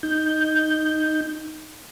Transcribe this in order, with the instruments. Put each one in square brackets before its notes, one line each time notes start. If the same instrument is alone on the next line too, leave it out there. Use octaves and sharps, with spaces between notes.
[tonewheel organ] D#4 G6